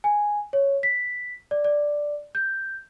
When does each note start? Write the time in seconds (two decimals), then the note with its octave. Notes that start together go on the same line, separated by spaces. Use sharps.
0.04 G#5
0.53 C#5
0.83 B6
1.51 D5
1.65 D5
2.35 G6